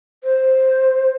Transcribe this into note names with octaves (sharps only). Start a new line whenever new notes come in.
C5